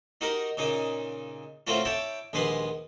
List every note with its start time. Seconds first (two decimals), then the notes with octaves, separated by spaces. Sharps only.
0.21 D#4 F#4 G4 A#4
0.57 A#2 C#3 D#4
1.67 A2 F#3 A3 C4 C#4 F4
1.85 E4 C#5 G5 A5 D6
2.33 A#1 D#2 G#3 B3 B4 C6